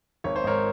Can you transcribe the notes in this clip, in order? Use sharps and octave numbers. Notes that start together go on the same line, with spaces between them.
G#1 C#5
C5
G#2 A#4 C#5